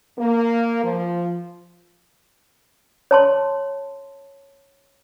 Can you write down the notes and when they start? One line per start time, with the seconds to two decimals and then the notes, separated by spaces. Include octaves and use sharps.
0.19 A#3
0.83 F3
3.11 C#5 A5 C6